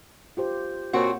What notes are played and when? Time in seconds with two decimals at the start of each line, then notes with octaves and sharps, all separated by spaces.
0.37 F4 G4 C5
0.93 A#2 A#3 C4 F#4 C#5